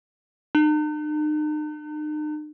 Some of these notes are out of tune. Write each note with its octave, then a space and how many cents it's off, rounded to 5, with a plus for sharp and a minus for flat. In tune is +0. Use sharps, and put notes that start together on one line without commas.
D#4 -45